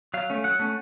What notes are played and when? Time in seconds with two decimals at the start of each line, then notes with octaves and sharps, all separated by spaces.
0.14 F#3 F5
0.30 A3 C#4
0.44 F#3 F#5
0.59 A3 C#4